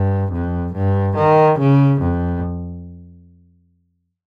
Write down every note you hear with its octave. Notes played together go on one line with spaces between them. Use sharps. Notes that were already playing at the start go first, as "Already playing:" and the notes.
Already playing: G2
F2
G2
D#3
C#3
F2